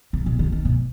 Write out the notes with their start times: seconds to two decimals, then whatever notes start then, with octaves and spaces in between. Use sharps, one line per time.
0.13 C3
0.26 B2
0.39 D#3
0.52 D#3
0.65 B2